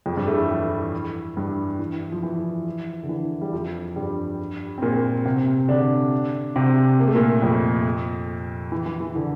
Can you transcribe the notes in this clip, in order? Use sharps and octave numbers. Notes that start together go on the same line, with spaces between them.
F2 F3
G2 G3
A2 A3
E3
E3
G2 G3
E3
F3
E3
D3
E3
G3
F2 F3
G2 G3
C4
A#2 A#3
C3 C4
D3 D4
C3 C4
A#3
A3
A#2 A#3
F2 F3
E3
E3
E3
D3